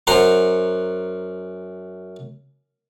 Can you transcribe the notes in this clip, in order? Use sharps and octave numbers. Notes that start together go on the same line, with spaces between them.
F#2 C5 F#5 A#5 C6